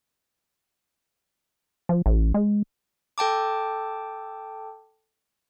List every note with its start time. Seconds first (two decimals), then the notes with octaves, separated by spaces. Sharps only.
1.89 F3
2.06 A1
2.34 G#3
3.18 A4 G5 A5 D6